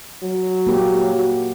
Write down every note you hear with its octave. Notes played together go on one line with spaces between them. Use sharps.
F#3
A#3 G4
F#4